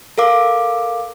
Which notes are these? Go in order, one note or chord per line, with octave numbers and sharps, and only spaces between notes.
A4 A#4 F5 D6